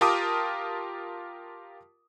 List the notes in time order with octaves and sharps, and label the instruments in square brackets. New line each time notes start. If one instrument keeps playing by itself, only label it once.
[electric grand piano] F4 G4 A#4 A5 D6 D#6